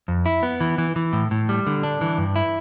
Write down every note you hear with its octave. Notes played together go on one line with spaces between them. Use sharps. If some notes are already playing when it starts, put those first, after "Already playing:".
F2
E4
B3
E3
E3
E3
A2
A2
G3
D3
D4
E3
G2
E4